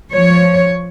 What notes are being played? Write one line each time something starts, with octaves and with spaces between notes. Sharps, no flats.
F3 C#5